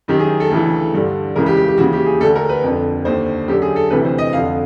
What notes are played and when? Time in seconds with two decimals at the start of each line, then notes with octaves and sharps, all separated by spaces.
0.08 F#2 D#3 G4
0.19 G#4
0.40 A4
0.50 D2 C#3 E3
0.94 G2 D3
1.36 C#2 C#3 E3 A#4
1.46 G4
1.57 G4
1.68 G4
1.78 D#2 C#3 E3 F#4
1.93 G4
2.06 G#4
2.20 D2 D3 A4
2.35 A#4
2.49 B4
2.64 F2 D3
3.05 D#2 D3 C5
3.48 F#2 G4
3.53 D3
3.62 G#4
3.76 A4
3.90 D2 C3 E3 B4
4.04 C5
4.18 D#5
4.33 F2 D3 F5